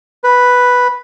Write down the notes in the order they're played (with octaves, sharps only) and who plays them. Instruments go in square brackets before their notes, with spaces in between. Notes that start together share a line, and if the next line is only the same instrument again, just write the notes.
[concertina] B4